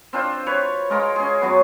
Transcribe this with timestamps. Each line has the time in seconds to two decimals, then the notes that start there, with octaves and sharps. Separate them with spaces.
0.13 C4 D4 F4 C5
0.47 B4 C#5
0.90 G#3 F4 A#4
1.16 C#4 G#4
1.41 F#2 F#3 B3